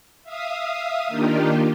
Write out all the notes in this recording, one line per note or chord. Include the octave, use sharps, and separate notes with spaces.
E5 F5 D#6
D#3 A#3 D4 D#4 F4 G4